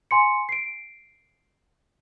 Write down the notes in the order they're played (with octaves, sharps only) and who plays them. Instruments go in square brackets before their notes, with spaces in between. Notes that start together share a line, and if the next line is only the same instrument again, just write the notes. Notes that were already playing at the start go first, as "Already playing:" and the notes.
[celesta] G#5 C6 C#7
C7 D7